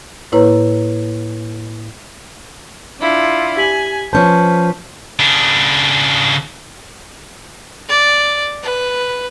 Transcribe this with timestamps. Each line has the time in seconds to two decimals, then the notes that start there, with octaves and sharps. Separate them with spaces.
0.32 A2 A#3 E4 B4 C#5 A#5
3.00 D4 E4 F4
3.57 G4 G#5 B6 F#7
4.13 F3 C#4 B4 C5 A5 G6
5.19 C#3 D4
7.89 D5
8.62 B4